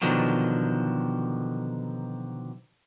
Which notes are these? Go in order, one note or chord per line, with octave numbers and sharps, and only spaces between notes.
B2 D3 D#3 F3 F#3